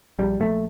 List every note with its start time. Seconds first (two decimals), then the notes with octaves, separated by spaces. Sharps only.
0.19 A#1 G3
0.40 A#1 A3